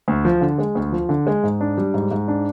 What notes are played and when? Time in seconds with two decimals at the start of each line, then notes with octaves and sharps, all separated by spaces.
0.08 D2
0.25 F3
0.41 D3
0.58 G#3
0.75 D2
0.92 F3
1.09 D3
1.27 G#3
1.43 G#2
1.61 D4
1.78 G3
1.94 G#2
2.11 G#2
2.28 D4